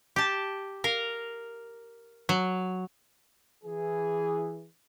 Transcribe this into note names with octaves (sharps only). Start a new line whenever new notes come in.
G4 A5
A#4 F5
F#3
E3 G#4